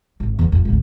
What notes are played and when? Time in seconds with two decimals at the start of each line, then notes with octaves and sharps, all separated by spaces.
0.20 G#1
0.39 E2
0.52 F2
0.65 G#1 D2